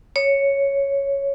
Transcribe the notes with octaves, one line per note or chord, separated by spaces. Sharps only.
C#5